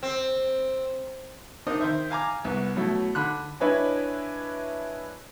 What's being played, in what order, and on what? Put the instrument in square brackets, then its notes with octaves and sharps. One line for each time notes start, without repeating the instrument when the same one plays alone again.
[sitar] C4
[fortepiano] C4 D4 D#4 A#4 D#5
D#3 C5 E5
F5 G#5 A#5 D6
C2 B3
B2 F#3 A3 E4
D3 B5 F#6
[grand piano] D4 E4 B4 C#5 D#5 G#5